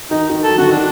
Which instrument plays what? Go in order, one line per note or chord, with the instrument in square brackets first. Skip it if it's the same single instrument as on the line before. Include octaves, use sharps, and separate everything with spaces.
[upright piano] D#3 [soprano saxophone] D#4
[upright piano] D#3
[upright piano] F#3 [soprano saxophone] A4
[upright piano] D3 [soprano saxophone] F#4
[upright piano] D#3 [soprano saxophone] D4